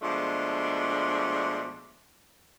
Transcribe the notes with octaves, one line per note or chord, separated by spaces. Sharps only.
B2 F3 G#3 A3 D4